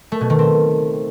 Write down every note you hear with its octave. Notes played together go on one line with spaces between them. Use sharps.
A3
B2
D#3
C4